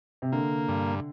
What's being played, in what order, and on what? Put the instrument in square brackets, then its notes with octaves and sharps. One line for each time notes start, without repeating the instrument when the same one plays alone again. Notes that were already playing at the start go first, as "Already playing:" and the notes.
[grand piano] C3
[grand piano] D3 [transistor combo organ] A#3
[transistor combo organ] G2